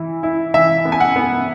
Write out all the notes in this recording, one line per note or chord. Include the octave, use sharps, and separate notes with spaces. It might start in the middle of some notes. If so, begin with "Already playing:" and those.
Already playing: E3 E4
E4
E3 E5
B3
G#5
F#5
B3